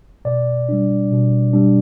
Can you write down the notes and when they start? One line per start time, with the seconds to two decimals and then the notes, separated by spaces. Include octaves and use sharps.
0.25 B2 D5
0.69 G3 D4
1.11 B2
1.53 G3 D4